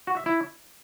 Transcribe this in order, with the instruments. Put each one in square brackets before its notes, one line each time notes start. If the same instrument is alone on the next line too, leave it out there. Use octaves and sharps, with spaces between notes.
[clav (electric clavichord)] F#4
E5
E4